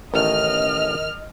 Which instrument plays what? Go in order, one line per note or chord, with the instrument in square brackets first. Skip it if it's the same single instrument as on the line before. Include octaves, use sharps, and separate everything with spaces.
[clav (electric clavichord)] A1 A3 [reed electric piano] D#3 A#4 [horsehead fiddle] D#5 [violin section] F6